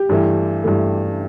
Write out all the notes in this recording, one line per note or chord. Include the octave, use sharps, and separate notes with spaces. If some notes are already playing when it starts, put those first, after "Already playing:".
Already playing: G4
G2 E3 A3
G2 E3 A3